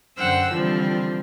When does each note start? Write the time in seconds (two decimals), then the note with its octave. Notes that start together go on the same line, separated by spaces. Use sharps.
0.18 F#2 D3 C5 F#5 G5 E6
0.50 D3 E3 F3 G3 C4